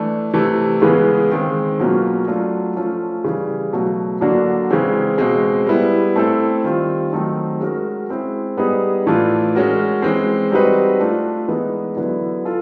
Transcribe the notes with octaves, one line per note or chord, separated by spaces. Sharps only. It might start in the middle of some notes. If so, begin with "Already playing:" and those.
Already playing: E3 A3 D4
C3 E3 A3
C#3 E3 G#3 B3
D#3 G#3 C4
B2 F#3 A#3 C#4 F4
F#3 A3 D4 F4
F3 A3 C#4 F4
C#3 E3 G3
B2 F#3 A3
D3 F#3 A#3 D4 F#4
C#3 E3 G#3 C4
B2 G#3 C4
G3 B3 E4
A3 C4 E4 A4
D#3 G3 C4 F4
D#3 F#3 A3 C4 D#4
G#3 C#4 F#4 A#4
G#3 C4 E4
G3 B3 D#4 G#4
A2 E3 A3 D4 F4
G#3 C#4 F#4 A#4
E3 G#3 C4
G3 C4 D#4 F#4 B4
A3 D4 F4
E3 G#3 B3 D#4
D3 F#3 B3 E4
F4 A4